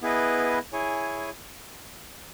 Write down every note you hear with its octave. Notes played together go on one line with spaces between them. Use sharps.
B3 E4 G#4 B4 D#5
E4 G#4 C#5 G#5